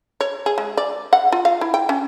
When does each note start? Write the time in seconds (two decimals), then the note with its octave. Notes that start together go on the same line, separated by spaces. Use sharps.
0.21 C#5
0.46 G#4
0.58 G#3
0.77 D5
1.13 F#5
1.32 F4
1.45 F5
1.61 E4
1.74 G5
1.89 C#4